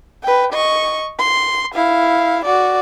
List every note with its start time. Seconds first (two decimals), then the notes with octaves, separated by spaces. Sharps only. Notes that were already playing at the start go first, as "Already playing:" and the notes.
0.23 B4 G5
0.53 D#5 C#6
1.19 C6
1.74 E4 F5
2.45 F#4 D5